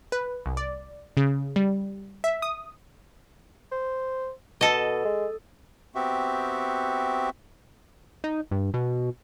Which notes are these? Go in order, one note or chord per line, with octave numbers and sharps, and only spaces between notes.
B4
C2
D5
C#3
G3
E5
D#6
C5
B2 A4 D#5
G#3
B3 C4 F#4 G4 E5
D#4
G2
B2